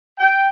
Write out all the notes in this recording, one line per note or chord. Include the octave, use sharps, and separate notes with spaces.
G5